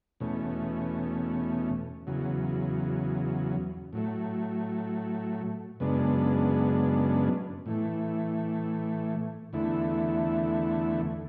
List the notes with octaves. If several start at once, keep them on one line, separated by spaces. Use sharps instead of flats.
E2 B2 A3 C#4
E2 C#3 F#3
A2 F#3 A3
F#2 C#3 G#3 B3 D4
A2 E3 A3
E2 D3 A3 E4